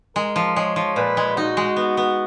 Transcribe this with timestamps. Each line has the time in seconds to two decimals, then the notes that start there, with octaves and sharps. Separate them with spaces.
0.16 G#3 A#4
0.36 F3
0.56 G#3 C#5
0.76 F3
0.96 A#2 B4
1.17 G#3
1.37 D#4 F#4
1.57 G#3
1.77 B3
1.97 B3